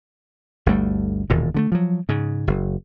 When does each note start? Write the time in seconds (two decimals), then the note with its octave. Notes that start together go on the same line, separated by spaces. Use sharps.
0.66 G1 D2 G3 A3
1.30 E1 D#2 A#2
1.54 D3 G#3 A3
1.72 F3 F#3
2.09 G#2 C#3
2.47 F#1